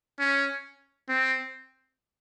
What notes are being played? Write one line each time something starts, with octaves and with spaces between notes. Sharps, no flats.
C#4
C4